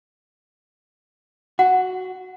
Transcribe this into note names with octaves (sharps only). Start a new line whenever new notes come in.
F#4 F#5